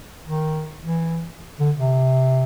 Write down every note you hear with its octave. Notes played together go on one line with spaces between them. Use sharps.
D#3
E3
D3
C3